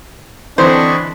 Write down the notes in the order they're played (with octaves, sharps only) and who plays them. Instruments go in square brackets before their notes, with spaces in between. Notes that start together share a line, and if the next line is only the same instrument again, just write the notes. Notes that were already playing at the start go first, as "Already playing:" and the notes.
[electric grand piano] D3 E3 [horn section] C4 D4 [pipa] C5 [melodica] D#5 B5 C#6